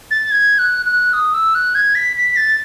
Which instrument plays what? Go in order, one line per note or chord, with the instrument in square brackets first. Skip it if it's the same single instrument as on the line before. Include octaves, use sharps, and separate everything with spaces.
[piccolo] A6
G#6
F#6
F#6
D#6
E6
F#6
G#6
B6
B6
A6